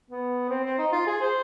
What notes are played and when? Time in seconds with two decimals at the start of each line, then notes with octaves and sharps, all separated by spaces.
0.11 B3
0.49 C4
0.64 C4
0.78 D#4
0.92 F4
1.06 G#4
1.21 C5